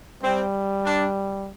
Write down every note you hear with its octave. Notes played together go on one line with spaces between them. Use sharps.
G3 C4
D4